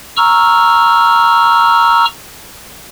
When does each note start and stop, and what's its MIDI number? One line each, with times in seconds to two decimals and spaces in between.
0.17 2.05 82
0.17 2.05 85
0.17 2.05 88
0.17 2.05 89